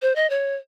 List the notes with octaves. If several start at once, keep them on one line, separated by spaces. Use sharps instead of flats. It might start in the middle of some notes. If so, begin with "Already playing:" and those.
C5
D#5
C#5